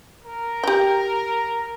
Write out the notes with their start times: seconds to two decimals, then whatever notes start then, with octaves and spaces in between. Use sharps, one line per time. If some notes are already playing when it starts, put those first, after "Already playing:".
0.25 A#4
0.64 G4 G5